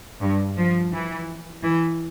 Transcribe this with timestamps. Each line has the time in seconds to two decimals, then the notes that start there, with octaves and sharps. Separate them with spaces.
0.21 G2
0.57 F3
0.92 E3
1.63 E3